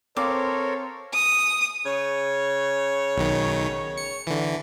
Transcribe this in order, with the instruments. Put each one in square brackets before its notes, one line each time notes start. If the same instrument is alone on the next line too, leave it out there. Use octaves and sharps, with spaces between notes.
[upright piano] C4 F5 [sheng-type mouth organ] A4 A#4 C5 [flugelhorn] C#5 [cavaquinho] D6
[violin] D#6
[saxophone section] C#3 C#5
[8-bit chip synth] B1 D#3
C#7
D3 E3